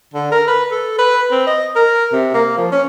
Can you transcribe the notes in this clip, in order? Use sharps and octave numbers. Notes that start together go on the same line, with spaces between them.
D3
A#4
B4
A4
B4
C4
D#5
A#4
C3
A#3
F3
C#4